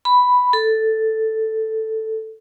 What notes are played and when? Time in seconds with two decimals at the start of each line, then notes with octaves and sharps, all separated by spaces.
0.05 B5
0.53 A4